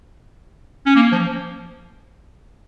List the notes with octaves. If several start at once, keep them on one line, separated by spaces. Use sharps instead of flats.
C#4
A#3
F3